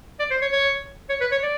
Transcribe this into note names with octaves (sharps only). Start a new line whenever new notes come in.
D5
C5
C#5
C#5
C#5
B4
C#5
D5